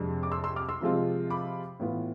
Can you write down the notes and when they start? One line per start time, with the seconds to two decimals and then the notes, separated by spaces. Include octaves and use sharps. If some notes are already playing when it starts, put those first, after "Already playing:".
Already playing: F2 C3 G#3 D4
0.23 D6
0.31 C6 E6
0.44 C6 E6
0.56 D6 F6
0.69 C6 E6
0.81 C3 F3 G#3 C4 F4
1.30 B5 D6
1.80 A2 E3 B3 F4